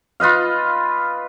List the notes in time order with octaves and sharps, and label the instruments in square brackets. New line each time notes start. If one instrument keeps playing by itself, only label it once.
[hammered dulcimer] F4 B4 D#5 F5